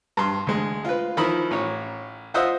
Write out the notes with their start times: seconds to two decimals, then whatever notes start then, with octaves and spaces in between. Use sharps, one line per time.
0.17 G2 C6
0.47 D2 G#3
0.85 F4 B4
1.17 D#3 F3 E4 B5 D#6
1.51 A1 C#5
2.34 F4 C5 D#5 E5 F#5 D#6